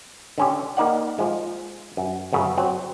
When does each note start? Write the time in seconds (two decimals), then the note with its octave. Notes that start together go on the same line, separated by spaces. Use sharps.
0.38 D3 C#4 G4
0.77 A#3 D#4 D5 F#5
1.19 F3 G#3
1.97 F#2
2.32 G1 F#2 C#3
2.58 F#3 C4